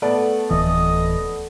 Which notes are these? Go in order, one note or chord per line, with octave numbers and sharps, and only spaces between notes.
A3 B3 D5
D1 E3 D#5